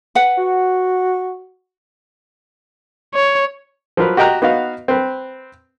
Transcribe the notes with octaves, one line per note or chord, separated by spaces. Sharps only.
B4 F#5
F#4
C#5
F3 F#3 A#4 B4
F#4 G4 D#5 G5 A#5 F#6
B3 D#4 F#4 F5
C4 B4